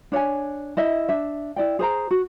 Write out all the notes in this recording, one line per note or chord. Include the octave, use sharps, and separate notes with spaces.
D4 C#5 E5 G#5
E4 D#5 E5
D4 E5
E4 D5 G5
G#4 C5 A#5
F#4